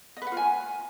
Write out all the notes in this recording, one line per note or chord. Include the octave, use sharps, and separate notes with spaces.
D#5
B4
F#5
F4
G#5